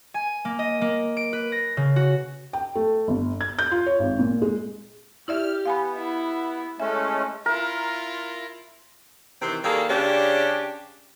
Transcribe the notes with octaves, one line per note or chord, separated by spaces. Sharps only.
G#5
A#3
D#5
A#3
D7
B4
A#6
C#3
F#4
G5
A3
G1
G#6
G6
F4
C#5
G#1
A#2
G#3
E4 G4 D5 E5 F6
B3 F5 G#5 B5
E4
G#3 A3 C#4 A4 E5
E4 F4 A#4
C3 D#3 E3 C4
D#3 G3 A#3 G#4 A4
C#3 C#4 D4 G4